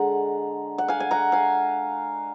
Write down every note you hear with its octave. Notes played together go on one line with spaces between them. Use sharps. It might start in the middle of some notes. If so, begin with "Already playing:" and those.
Already playing: D3 G#3 F#5 A#5
F#5
F5 G#5
G#5
F#5 A#5
F5 G#5